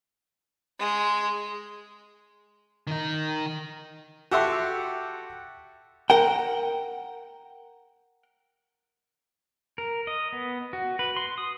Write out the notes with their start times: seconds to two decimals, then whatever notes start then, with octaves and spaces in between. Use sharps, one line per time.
0.79 G#3
2.87 D#3 D#4
4.31 F#4 G4 A4 E5 F#5 C6
6.10 A#4 F#5 G5
9.78 A#4
10.07 D#5
10.32 B3
10.73 F#4
10.99 B4
11.17 C6
11.38 D#6